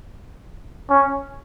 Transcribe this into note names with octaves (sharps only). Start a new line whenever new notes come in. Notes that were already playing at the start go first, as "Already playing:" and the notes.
C#4